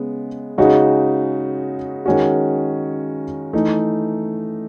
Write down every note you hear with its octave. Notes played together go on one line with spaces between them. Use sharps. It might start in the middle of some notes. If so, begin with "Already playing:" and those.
Already playing: C#3 G#3 B3
C#3 G#3 D#4 F#4
D#3 G#3 C#4 F#4
E3 A3 D#4